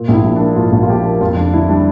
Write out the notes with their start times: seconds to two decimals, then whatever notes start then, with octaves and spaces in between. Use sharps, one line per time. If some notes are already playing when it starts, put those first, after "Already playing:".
Already playing: A#2
0.08 A#1
0.13 E4
0.24 F3
0.36 D4
0.40 A#3
0.56 A#2 F4
0.72 A#1
0.83 F4
0.88 F3 G4
1.05 A#3
1.21 F2 F4
1.36 F1 D4
1.53 D3 E4
1.69 G3 D4